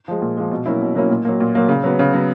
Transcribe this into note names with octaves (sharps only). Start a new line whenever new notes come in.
F3 G#3
A#2
F3 G#3
B2
F#3 A#3 C#4 E4
B2
F#3 A#3 C#4 E4
A#2
F#3 A#3
A#2
F#3 A#3
C#3
F#3 B3
C#3
F#3 B3